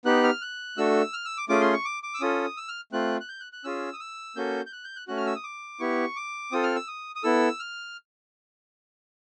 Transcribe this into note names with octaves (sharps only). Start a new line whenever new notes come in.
B3 D#4 G4 F#6
F6
F#6
A3 D4 F#4 A4 E6
F6
E6
D6
A3 C#4 F4 G#4 D6
C6
C#6
D6
D6
E6
C#4 F4 A4 D#6
E6
F6
A3 C4 F4 F#6
F#6
G6
F#6
F#6
C#4 F4 G#4 E6
D#6
E6
A#3 C#4 F#4 A4 G6
G6
F#6
G6
F#6
A3 C#4 F#4 F#6
F6
E6
D#6
D6
B3 E4 G4 C#6
D6
C4 F4 A4 D#6
F6
E6
D#6
D#6
B3 E4 A4 E6
F6